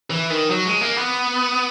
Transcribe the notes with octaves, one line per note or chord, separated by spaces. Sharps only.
E3
D#3
F#3
G#3
A#3
B3